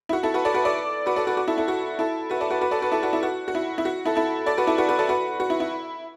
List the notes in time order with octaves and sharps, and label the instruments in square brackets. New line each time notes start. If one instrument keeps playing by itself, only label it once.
[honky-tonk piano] E4
F#4
E4 A4
F#4 B4
A4 D5
F#4 B4
A4 D5
F#4 B4
A4 D5
F#4 B4
F#4
E4 A4
E4 A4
F#4
E4 A4
F#4 B4
A4 D5
F#4 B4
F#4 B4
A4 D5
F#4 B4
E4 A4
F#4
E4
F#4
F#4
E4
E4
F#4
E4 A4
E4 A4
A4 D5
F#4 B4
E4 A4
F#4 B4
F#4 B4
A4 D5
F#4 B4
F#4
E4
E4